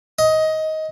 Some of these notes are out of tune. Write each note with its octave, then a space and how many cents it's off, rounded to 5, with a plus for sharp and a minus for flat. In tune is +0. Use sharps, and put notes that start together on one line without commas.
D#5 +15